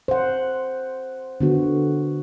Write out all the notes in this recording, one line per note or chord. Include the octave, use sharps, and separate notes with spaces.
C5 F#5
D3 B3 F#4